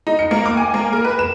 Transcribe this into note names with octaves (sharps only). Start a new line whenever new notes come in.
D#4
C#7
A#3
D6
G#5
A#3
A#4
B4
E7